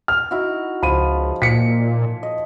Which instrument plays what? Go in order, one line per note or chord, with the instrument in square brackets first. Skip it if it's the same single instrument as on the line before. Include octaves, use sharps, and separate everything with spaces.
[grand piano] F6
[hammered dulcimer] D#4 E4 F#4
[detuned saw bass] C#2 [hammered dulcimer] F3 [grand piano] B5 D#7
[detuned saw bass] A#2 [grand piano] B6 C#7
[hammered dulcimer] D#5